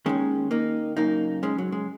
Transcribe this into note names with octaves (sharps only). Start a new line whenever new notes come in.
D#2 D#3 G#3 C#4
A#3 D#4
F#2 C#3 A#3 D#4
G#3 C#4
F#3
G#3